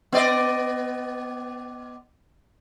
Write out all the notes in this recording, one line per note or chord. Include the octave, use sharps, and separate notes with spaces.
B3 D5 D#5